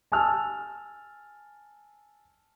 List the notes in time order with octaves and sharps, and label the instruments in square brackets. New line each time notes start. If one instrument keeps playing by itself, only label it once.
[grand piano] G#5 A5 E6 F6